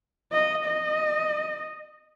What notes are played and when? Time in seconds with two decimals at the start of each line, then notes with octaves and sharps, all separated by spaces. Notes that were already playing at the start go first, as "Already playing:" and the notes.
0.32 D#5
0.65 D#5